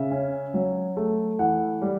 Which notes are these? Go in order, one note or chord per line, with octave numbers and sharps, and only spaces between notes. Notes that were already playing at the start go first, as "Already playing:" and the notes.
Already playing: C#3 E5
C#4
F#3
A3
E3 F#5
G3